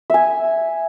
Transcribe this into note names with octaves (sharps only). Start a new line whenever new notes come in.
E5 G#5